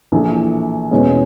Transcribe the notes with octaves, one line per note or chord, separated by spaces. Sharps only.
A#1 A2 E3 A3
E2 B2 G#3 C#4